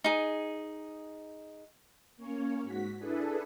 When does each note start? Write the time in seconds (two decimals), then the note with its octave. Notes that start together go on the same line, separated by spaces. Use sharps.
0.04 D#4 G#4
2.17 A#3 C#4 C#5
2.63 G#2 F#4 B6
2.98 D4 E4 G#4 A4 B4